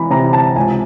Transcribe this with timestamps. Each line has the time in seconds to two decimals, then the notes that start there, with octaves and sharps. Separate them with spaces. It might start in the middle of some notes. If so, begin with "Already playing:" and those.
Already playing: C3 E3 A#5 B5
0.10 C3 A#5
0.33 A5
0.56 C#2 G#5